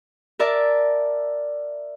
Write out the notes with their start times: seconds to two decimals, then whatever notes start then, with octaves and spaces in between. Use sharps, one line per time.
0.39 A#4 D5 E5 A5